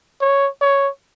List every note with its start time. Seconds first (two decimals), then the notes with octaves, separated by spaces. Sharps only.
0.21 C#5
0.61 C#5